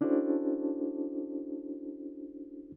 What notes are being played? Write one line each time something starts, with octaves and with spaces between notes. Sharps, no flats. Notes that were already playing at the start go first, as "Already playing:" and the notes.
C#4 D4 E4 F#4 A4 C5